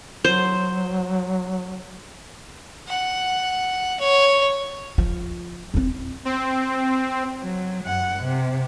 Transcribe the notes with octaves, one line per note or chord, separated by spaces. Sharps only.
F#3 C5
F#5
C#5
F3
C4 E4
C4
F#3
F#2 F#5
C3